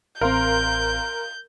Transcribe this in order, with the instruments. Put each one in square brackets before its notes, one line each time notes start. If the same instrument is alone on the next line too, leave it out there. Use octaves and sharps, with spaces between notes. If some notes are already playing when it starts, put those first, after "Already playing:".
[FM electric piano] A1 C4 [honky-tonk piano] A#4 F5 C6 [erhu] G6